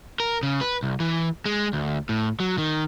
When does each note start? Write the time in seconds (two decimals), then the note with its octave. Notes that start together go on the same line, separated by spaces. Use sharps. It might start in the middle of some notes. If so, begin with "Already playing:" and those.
0.20 A#4
0.43 C#3
0.61 B4
0.83 C2
1.00 E3
1.46 G#3
1.73 D2
2.09 A2
2.40 F#3
2.58 D#3